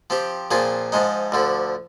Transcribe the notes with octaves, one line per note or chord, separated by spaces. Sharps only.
F3 C4 G4
A#2 F3 C4 F4 G#4
G#2 F3 G#3 D#4
D2 D3 F3